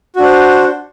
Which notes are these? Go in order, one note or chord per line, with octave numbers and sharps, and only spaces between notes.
D4 F#4 C5